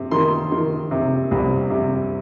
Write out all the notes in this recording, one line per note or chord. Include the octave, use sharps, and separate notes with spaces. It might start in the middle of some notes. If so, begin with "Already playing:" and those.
Already playing: C3
D#3 C6
D#3
C3
C2
C3